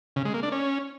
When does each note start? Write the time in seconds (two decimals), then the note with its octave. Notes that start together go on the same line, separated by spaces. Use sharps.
0.16 C#3
0.25 G#3
0.34 A#3
0.43 D4
0.52 C#4